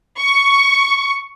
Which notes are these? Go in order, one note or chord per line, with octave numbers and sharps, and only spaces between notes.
C#6